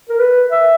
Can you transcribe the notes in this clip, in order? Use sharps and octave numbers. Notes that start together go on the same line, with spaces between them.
A#4
B4
E5